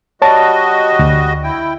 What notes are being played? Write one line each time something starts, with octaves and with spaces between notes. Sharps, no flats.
G3 F#4 C#5 D#5 A5
D2
E4 G5